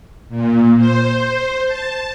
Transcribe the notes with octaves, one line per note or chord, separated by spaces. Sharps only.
A#2
C5
A5